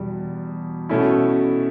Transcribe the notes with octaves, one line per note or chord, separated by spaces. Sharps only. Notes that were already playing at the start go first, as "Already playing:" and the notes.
Already playing: E2 B2 G3
B2 A3 C#4 E4